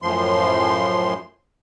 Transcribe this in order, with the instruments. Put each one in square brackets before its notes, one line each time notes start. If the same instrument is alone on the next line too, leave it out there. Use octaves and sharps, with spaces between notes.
[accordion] F#2 A2 F3 C6